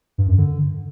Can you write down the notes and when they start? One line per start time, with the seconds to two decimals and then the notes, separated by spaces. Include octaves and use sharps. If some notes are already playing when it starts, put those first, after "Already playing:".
0.18 G2
0.28 F#2
0.38 D3